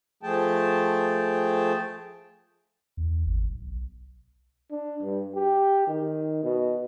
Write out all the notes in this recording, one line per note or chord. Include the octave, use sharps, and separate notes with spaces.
F3 A3 G#4 G5 A5
E2
G#1
B1
D4
G2
G4
D#3
B2